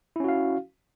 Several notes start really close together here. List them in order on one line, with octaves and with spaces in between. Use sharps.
E4 C#4 F#4 F5